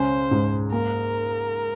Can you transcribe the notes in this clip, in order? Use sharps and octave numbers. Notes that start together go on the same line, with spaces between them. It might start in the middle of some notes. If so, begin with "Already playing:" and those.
Already playing: C#2 C#4 C5
G#2
A#3 A#4